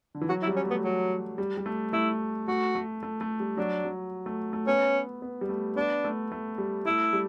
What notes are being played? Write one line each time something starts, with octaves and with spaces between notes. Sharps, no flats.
D3
E3
F#3 F#4
E4
G3
C#4
A3
B3
F#3 G3
G3
G3
A3
A3 E4
A3 F#4
A3
A3
A3
G3
F#3 D4
F#3
A3
A3
B3 C#4
B3
G3
A3
B3 D4
A3
A3
G3
A3 E4
G3